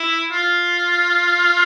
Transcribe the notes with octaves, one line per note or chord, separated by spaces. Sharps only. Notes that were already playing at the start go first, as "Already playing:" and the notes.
Already playing: E4
F4